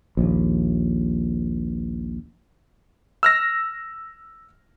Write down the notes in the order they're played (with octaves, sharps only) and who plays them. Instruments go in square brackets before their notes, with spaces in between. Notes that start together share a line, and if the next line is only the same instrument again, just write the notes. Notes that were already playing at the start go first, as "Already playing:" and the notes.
[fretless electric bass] A#1 D#2
[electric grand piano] E6 F6 A#6